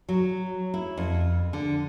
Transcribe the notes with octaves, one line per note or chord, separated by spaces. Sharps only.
F#3
E4
F2
D3